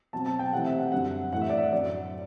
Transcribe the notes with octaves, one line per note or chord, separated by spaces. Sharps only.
B2 F#3 C4 A5
A5
G5
C3 E3 A3 C4 F#5
E5
F#5
F#2 D3 G3 F#5
A2 E3 A3 F#5
E5
D5
E5
F#2 D3 F#3 D5